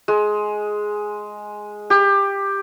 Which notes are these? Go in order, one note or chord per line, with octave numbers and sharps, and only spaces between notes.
G#3
G4